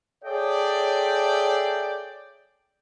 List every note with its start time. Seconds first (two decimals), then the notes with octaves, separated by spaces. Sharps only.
0.24 G#4 A4 C#5 D5 E5 G5